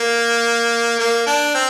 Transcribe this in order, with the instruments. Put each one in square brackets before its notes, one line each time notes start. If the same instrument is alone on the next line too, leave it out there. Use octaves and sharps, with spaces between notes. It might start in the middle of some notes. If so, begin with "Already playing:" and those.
Already playing: [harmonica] A#3
A#3
D4
C4